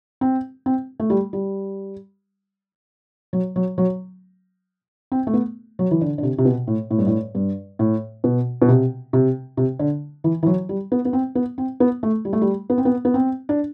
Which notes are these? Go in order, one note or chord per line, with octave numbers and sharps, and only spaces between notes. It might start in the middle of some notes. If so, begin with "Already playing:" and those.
C4
C4
A3
G3
G3
F#3
F#3
F#3
C4
A3
B3
F#3
E3
D3
D3
C3
C3
B2
A2
A2
G2
A2
G2
A2
B2
B2
C3
C3
C3
D3
E3
E3
F#3
G3
B3
B3
C4
B3
C4
B3
A3
G3
A3
G3
B3
C4
B3
B3
C4
D4